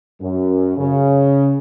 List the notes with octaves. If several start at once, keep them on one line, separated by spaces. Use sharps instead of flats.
F#2
C#3